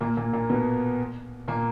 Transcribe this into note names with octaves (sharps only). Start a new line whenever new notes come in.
A#2 A#3
A#2 A#3
A#2 A#3
B2 B3
A#2 A#3